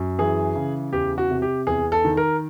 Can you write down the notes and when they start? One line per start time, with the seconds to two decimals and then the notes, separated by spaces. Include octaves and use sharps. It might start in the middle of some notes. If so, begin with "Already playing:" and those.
Already playing: F#2
0.19 E3 G#4
0.55 C#3
0.93 E2 G4
1.18 F#4
1.30 C3
1.42 G4
1.67 E2 G#4
1.92 A4
2.04 D#3
2.17 A#4